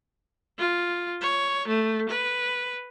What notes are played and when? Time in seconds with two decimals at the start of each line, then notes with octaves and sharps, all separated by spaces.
0.59 F4
1.21 C#5
1.68 A3
2.09 B4